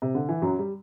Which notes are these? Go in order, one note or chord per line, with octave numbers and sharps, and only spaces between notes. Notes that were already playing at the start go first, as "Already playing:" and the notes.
C3
D3
E3
F#2 F#3
G3